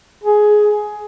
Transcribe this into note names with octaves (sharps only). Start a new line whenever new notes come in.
G#4